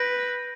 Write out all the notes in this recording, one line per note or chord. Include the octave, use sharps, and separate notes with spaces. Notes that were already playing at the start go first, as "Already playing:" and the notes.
Already playing: B4 G6 A#6 D7